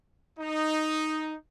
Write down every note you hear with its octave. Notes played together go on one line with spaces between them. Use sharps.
D#4